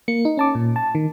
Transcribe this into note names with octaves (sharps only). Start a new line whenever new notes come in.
A#3 C#7
D#4
C#4 A5 D6
A#2
A5
D#3